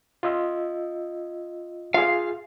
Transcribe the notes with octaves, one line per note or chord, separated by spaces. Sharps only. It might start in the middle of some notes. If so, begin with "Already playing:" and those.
F4 D#5 E6
F4 G#4 F5